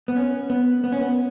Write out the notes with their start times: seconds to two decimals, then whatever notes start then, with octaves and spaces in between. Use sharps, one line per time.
0.08 B3
0.16 C#4
0.50 B3
0.84 B3
0.92 C#4
1.01 B3